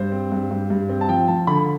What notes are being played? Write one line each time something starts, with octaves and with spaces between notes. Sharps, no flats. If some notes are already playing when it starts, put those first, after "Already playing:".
Already playing: G2 C5
C4
G2
G2
G2
C4
A5
F3 G5
F3 A5
D3 B5